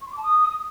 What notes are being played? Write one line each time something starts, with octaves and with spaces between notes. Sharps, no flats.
C#6
C6
D6
A5
D#6